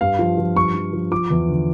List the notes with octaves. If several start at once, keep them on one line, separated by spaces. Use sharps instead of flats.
G2 F5
F3
F3
G2 C#6
F3
F3
F3 D6
E2
D3